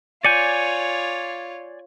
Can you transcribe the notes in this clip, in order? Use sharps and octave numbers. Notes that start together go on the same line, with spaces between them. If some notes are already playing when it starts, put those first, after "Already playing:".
F4 C#5 D5 G#5 G6 C#7